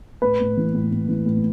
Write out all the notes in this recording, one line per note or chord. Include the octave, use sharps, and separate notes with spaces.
A2 B4
A2
E3
A2
A2
E3
A2